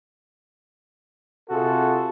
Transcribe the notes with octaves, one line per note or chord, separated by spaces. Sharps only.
C3 F4 F#4 G#4 A4